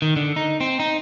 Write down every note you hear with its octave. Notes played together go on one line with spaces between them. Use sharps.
D#3
D3
D#4
C4
D#4